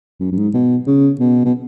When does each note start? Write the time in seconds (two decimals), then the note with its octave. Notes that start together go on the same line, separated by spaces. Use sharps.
0.20 F#2
0.32 F#2
0.37 G#2
0.54 B2
0.87 C#3
1.20 B2
1.45 B2